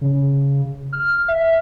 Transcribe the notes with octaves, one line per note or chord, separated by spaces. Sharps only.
C#3
F6
E5